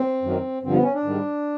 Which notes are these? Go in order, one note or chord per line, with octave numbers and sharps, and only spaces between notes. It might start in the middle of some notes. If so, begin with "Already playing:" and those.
Already playing: C4
F#2 D#3 F#3
G2 D3 F3 C4
B3
C#4
D4
G#2 D#3 G3